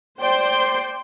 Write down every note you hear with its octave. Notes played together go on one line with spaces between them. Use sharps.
C5 D5 G5 C6